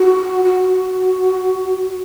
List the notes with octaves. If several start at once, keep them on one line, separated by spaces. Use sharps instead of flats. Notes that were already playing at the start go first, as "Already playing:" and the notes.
Already playing: F#4
F#4